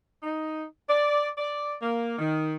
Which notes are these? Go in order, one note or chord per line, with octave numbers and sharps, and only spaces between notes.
D#4
D5
D5
A#3
D#3